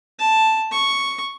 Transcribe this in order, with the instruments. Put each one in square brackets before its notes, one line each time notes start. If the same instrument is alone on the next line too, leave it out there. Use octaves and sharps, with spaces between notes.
[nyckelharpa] A5
C#6